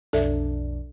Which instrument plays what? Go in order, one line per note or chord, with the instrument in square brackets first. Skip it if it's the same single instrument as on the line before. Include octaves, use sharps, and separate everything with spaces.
[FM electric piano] B1 F2 D4 [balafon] A4 E5